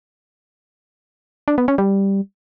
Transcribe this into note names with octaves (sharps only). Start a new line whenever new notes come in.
D4
B3
C#4
G3